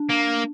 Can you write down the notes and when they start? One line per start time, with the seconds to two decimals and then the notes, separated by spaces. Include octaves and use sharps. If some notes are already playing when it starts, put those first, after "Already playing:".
Already playing: D4
0.09 A#3